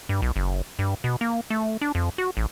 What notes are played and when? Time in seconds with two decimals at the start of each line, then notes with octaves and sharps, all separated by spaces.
0.09 G2
0.22 B1
0.36 F#1
0.79 G2
1.04 B2
1.21 A#3
1.50 A3
1.81 D4
1.95 F2
2.18 F#4
2.37 A1